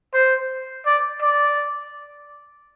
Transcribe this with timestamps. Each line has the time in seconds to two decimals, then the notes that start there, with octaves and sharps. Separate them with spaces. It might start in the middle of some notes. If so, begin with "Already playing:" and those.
0.14 C5
0.86 D5
1.22 D5